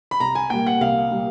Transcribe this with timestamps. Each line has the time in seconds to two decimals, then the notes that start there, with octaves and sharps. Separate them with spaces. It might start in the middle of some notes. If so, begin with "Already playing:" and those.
0.11 B5
0.20 C2 A#5
0.35 G#5
0.50 A#2 G3 A#3 G5
0.67 F#5
0.81 C2 F5
1.11 A#2 G3 A#3